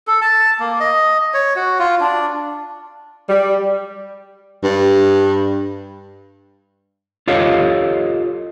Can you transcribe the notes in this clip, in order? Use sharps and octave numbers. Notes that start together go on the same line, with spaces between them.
A4
A5
A#3
D#5
C#5
F#4
F4
D4
G3
G2
F4 G4 A4 C#5 D#5 F5